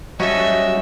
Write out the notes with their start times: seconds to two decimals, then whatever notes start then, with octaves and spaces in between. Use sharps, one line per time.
0.20 F#3 G3 C#4 F#4 A4 D#5 E5